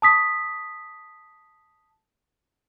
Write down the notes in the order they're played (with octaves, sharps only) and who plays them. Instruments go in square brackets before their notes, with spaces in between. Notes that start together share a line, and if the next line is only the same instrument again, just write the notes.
[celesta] A5 D#6 B6